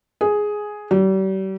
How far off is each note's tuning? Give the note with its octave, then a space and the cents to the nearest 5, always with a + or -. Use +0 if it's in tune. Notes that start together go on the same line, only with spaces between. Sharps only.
G#4 +5
G3 -40